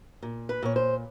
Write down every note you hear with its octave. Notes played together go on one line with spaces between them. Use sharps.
A#2
B4
A#2 C#5
C5